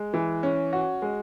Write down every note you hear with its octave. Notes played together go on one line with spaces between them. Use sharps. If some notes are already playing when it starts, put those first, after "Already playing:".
Already playing: G#3
E3
C#4
F#4
G#3